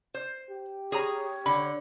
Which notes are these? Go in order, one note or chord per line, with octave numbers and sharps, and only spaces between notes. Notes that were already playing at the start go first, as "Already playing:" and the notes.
C5
G4
G#4 C#5 A#5
D3 B5